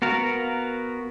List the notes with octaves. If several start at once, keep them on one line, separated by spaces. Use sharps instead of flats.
B3 F#4 A#4 F5